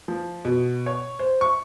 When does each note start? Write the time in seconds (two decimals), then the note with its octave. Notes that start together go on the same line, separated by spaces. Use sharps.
0.08 F3
0.45 B2
0.86 C#5
1.19 C5
1.41 C#6